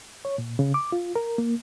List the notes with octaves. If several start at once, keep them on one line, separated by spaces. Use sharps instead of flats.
C#5
A#2
C#3
D6
F4
A#4
A#3